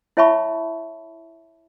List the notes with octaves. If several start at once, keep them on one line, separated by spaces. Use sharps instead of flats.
E4 C#5 E5 A5 B5 C#6